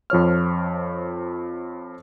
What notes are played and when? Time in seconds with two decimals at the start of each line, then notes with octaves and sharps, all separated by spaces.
0.10 F2 F3 C#5 F6